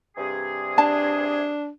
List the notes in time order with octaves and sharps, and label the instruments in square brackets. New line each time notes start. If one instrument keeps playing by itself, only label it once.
[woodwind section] G2 C3 G#4
[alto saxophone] D4 [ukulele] A5